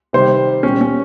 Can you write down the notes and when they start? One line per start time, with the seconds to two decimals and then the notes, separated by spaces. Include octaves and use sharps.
0.13 C3 D#3 G3 C5
0.63 A#2 G3 C#4
0.81 C#4